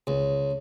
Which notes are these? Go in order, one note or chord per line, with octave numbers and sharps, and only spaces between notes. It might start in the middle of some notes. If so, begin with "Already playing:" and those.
C#2